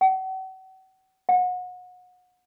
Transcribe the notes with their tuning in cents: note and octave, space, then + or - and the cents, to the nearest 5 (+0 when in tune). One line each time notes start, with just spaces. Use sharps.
F#5 +40
F#5 -30